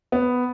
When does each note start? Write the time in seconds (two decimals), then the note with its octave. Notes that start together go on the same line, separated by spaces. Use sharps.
0.12 B3